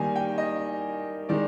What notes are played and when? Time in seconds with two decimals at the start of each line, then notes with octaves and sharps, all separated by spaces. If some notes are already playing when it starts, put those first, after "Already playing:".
Already playing: D#3 G3 A#3 D#4 G#5
0.16 G5
0.38 D#5
1.29 D#3 G#3 D#4 D5